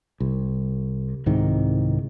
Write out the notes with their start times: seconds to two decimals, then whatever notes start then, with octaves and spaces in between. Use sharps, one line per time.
0.20 C2
1.26 C2 G#2 C3 D#3